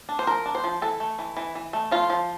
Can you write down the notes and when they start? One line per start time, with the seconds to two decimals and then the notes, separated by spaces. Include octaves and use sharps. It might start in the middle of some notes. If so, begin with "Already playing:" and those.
0.09 D4
0.19 C5
0.27 F3 A#4
0.46 D4
0.55 C5
0.64 F3
0.82 E3 A4
1.00 A3
1.19 E3
1.37 E3
1.55 E3
1.73 A3
1.91 F3 F4
2.10 F3